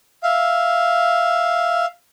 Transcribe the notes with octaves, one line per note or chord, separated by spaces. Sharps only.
E5 F5